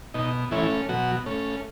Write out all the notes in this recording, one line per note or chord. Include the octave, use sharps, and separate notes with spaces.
B2 D#4
E3 A3 C#4 E4
B2 F#3 F#4
A3 C#4